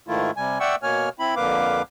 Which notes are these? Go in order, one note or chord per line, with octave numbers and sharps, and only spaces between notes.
G#2 D#3 A3 E4 F4
C3 G3 G#5
D5 E5 F#5 G5 C#6 E6
B2 A#3 C#5 G#5 F6
C4 E4 B5
F2 D3 A#3 B4 F5 D6